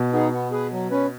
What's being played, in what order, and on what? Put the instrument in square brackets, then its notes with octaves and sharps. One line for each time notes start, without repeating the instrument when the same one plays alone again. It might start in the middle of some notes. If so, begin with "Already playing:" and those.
Already playing: [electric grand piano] B2
[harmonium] B3 D#4 G#4
B3
G#4 B4
F#3
C#4 B4